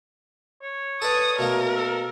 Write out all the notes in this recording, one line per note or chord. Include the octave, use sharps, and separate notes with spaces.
C#5
A4 B4 D5 D#6
B2 A3 A#3 A#4
A4